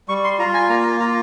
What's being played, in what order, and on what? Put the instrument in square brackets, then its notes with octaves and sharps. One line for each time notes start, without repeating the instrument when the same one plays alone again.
[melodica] G3 C#6
C6
F4 A#5
G#5
A#3 A#5
F4 A#5